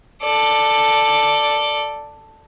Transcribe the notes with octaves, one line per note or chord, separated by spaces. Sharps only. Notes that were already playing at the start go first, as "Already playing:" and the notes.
A4 D5